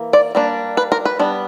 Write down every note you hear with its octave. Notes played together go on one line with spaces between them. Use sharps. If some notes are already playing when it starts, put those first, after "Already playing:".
Already playing: E3 A#3
D5
G3 A#3 D4
B4
A#4
B4
G3 B3 D4